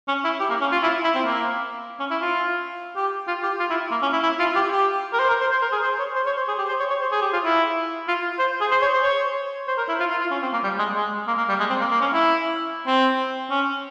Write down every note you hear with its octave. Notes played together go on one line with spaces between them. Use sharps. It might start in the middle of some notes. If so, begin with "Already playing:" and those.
C#4
E4
G4
A#3
C#4
F4
E4
E4
C4
A#3
C#4
E4
F4
G4
F4
G4
F4
E4
A#3
C#4
E4
E4
F4
G4
G4
A#4
C5
A#4
C5
C5
A#4
G#4
C5
C#5
C5
C#5
C5
G#4
G4
C5
C#5
C#5
C5
G#4
G4
F4
E4
F4
C5
G#4
C5
C#5
C5
C#5
C5
A#4
E4
F4
F4
F4
C#4
C4
A#3
G3
G#3
G#3
A#3
A#3
G3
G#3
C4
A#3
A#3
C#4
E4
C4
C#4